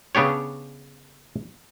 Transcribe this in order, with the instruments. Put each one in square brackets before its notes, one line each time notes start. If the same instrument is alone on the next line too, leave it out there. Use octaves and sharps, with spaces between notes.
[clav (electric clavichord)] C#3 B3 D4 G4 C#5